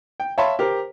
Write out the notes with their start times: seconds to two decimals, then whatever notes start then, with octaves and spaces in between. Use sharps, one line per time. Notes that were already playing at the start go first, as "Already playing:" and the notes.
0.20 G5
0.38 C#5 E5 F5 A5 B5 C6
0.59 G4 A#4 C5